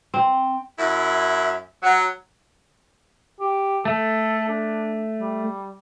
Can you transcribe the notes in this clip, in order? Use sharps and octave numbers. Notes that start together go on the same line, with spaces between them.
C4
F#2 E4
F#3
G4
A3 A4
D4
G3